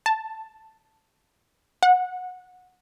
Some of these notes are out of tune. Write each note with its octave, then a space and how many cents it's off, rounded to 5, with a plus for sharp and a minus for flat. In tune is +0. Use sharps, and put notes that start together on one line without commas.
A5 +5
F#5 -20